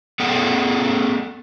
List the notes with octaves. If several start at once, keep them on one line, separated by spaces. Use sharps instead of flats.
B3 G#4 A4 F#5 G5